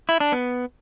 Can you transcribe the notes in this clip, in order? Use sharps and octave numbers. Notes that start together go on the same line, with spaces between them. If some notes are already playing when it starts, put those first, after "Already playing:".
E4
D4
B3